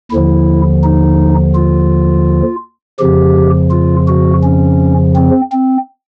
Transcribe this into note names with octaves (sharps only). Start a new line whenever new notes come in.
D#2 D3 F3 E4
D#4
F4
F2 C#3 F3 G4
F4
F#4
C#4
C4
C4